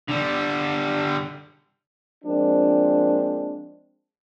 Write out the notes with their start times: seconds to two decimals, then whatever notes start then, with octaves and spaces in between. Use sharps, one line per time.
0.08 D3 G3
2.24 F3 G#3 A#3 C4 D4